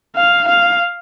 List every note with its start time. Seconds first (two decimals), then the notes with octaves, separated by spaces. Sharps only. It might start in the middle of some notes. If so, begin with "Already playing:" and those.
0.16 F5
0.48 F5